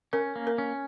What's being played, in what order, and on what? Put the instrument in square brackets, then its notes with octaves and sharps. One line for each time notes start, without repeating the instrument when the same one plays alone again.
[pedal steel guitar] C#4 [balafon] A#4
[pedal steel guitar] A#3
[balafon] A#4
[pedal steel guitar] C#4